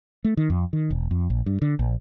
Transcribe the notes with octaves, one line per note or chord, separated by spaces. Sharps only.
A3
D#3
F2
D#3
E1
F2
A#1
G2
D3
A#1